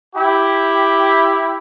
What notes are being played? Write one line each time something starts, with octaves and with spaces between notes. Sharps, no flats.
E4 G4